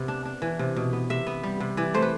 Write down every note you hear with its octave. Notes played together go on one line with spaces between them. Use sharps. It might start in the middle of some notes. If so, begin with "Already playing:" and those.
Already playing: C3 B3
D4
D4
E3
C3
B2
B3
C3 E5
B3
G3
C3
E3 D5
A3 C5
B4